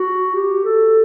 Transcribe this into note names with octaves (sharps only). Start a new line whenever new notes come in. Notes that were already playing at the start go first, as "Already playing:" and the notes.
Already playing: F#4
G4
A4